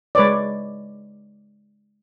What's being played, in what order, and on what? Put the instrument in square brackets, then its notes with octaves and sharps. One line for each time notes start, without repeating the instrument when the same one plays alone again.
[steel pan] G#3 B4 C#5 D5